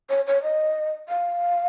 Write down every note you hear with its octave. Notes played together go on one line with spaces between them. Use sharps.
C#5
C#5
D#5
F5